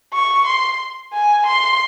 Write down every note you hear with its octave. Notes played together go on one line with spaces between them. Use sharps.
C#6
C6
G#5
C6